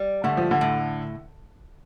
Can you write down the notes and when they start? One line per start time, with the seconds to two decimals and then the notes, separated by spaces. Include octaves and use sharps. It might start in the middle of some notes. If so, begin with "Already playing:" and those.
Already playing: G3
0.24 D3 A3
0.37 F3
0.51 D3
0.61 A2